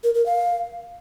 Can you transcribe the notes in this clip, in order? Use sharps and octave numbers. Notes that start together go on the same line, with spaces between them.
A#4
A#4
F5